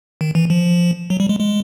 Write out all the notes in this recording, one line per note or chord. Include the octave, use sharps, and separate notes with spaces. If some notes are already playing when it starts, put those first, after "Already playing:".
D#3
E3
F3
F#3
G3
G#3
G#3